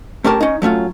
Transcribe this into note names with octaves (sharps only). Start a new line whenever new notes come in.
A3 C#4 G4 A#4 A5
C#4 D#4
F#3 A3 C#4 F4